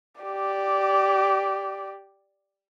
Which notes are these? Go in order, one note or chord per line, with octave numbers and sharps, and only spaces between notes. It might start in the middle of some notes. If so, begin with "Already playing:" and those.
G4 D5